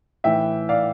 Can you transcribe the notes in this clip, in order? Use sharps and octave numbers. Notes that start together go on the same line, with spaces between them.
A2 E3 E5 G5
D5 F5